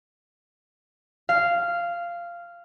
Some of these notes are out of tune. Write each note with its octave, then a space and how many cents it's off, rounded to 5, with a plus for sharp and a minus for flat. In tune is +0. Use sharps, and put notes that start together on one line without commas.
F5 -10